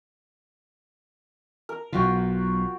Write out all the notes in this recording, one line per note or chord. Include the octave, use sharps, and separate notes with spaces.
A#4
B1 B2 F4 F#4 G5